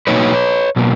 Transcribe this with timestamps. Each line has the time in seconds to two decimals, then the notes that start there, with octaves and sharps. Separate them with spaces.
0.07 B2 F#3 A#3 D#4 B4 C#5
0.76 B2 F#3 A#3